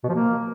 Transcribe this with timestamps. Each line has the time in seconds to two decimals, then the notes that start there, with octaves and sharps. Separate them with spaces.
0.04 B2
0.09 F3
0.14 A#3